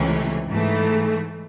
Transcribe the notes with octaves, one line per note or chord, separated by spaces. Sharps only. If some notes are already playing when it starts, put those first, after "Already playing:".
Already playing: C#2 C3 E3 A3 C#4
G#2 E3 A3